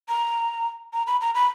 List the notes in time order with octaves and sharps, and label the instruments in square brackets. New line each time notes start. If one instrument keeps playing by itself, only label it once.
[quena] A#5
A#5
B5
A#5
B5